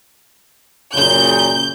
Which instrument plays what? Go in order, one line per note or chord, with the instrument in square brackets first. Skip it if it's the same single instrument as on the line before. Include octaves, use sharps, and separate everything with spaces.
[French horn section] F#2 A#2 C#3 [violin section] G6